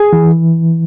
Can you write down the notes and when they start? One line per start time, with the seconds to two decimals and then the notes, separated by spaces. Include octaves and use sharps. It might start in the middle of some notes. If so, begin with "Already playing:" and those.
Already playing: G#4
0.13 E3